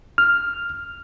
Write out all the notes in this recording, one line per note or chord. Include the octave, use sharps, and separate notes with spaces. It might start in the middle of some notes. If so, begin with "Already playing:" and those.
F6